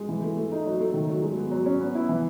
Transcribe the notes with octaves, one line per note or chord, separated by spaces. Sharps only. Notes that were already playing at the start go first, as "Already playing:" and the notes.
Already playing: G#3
E3
A3
A3
D#4
F#3
A3
D#3
F#3
G#3
B3
F#3
C#4
B3
E4
E3